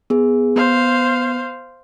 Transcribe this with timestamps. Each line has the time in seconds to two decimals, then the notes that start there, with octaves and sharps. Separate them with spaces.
0.10 B3 G#4
0.56 B3 C5 F5